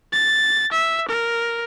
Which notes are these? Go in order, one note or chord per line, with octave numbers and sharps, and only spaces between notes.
A6
E5
A#4